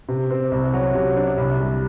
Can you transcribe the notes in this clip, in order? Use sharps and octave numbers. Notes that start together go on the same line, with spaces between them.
C3
C4
C2
F#3
C3
D4
C2
G3